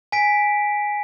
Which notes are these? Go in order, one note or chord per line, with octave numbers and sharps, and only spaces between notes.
G#5 B6 D7